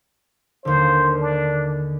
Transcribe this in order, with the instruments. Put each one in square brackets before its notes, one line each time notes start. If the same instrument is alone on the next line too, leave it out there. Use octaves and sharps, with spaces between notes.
[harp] D#2 D3 [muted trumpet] C5
[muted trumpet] D4